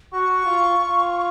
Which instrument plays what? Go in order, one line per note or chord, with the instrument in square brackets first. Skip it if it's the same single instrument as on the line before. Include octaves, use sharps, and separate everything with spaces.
[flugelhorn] F#4 [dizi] C#6
[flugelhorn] F4
F4